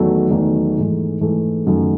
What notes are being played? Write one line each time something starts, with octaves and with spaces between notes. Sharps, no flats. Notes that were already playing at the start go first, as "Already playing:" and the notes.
Already playing: E2 D#3 F#3 A3
E2 D#3 F#3 A3
G#2 E3 A3
G#2 E3 A3
F#2 D#3 F#3 A3